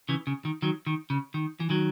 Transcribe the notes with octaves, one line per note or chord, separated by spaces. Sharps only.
C#3 E3
C#3
D#3
D#3 F#3
D#3
C#3
D#3
E3
D#3 F#3